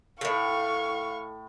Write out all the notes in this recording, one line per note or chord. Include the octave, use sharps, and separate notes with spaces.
A2 C3 F5 C#6